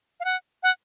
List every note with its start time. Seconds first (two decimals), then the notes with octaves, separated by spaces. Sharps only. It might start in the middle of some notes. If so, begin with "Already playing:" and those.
0.20 F5
0.24 F#5
0.63 F#5